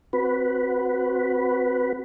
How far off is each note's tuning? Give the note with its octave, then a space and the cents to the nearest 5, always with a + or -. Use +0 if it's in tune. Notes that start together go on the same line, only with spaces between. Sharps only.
C4 +0 F#4 +0 B4 +0